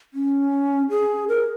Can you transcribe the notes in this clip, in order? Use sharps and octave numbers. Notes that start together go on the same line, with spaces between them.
C#4
G#4
A#4